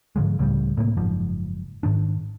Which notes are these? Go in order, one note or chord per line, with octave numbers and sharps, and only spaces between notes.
G#2 D3 F3 G#3
C#2 A2 C#3 G3
A2 C3 A#3
F#1 G#2 F3
G#2 D#3 D4